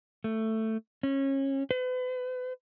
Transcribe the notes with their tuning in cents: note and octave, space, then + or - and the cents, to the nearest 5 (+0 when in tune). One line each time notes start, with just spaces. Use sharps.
A3 +10
C#4 -25
B4 +40